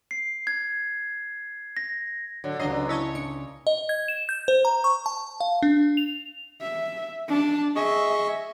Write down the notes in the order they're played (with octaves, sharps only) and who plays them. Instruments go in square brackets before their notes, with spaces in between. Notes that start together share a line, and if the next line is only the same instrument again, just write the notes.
[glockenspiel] C7
G#6
A#6
[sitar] D3 [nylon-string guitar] F#3
[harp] C#2 A#5 [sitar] G2 D3 D#5 [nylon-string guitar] F#3 [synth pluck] C7
[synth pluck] E4 A5 [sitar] C#5 D#5
[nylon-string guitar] D4 [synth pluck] C#7
[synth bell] D#5
G#6
E7
G6
C5
A#5
C#6
A5
F5
D4
F7
[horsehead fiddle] E5
D4 A5
[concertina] G#4 D#5 C#6 [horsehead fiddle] E5